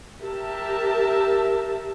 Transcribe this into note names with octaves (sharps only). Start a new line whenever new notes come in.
G4 A#4 E5 A5